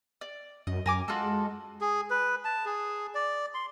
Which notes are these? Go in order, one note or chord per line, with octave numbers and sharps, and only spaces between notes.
D5
F#2 D#5
F#2 A#4 G#5 D6
G#3 F4 F#4 A4
G#4
B4
A5
G#4
D5
C6